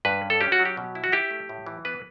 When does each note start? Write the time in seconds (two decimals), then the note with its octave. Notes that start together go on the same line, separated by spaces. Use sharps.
0.05 G2 B4
0.22 C#4
0.30 A4
0.41 C#4 G4
0.52 F#4
0.59 F#3
0.65 G4
0.77 B2
0.95 E4
1.04 F#4
1.12 E4 G4
1.31 A3
1.49 A2
1.67 E3
1.85 B3 B4